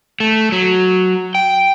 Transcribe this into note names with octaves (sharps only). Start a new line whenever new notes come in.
A3
F#3
G5